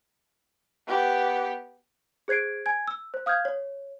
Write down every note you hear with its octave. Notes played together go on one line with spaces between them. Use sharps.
B3 G4
G#4 C5 G#6 C7 D7
G#5 G#6
E6
C5
F5 D#6 F6 G6 G#6
C#5